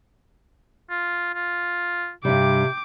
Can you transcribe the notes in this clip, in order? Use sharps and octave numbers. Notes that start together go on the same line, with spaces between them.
F4
F4
G2 C3 G3 G5 D6